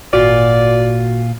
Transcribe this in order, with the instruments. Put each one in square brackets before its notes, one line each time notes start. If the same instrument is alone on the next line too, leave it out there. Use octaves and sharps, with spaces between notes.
[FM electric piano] G#1 F#4 [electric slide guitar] A#2 F4 [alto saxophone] D5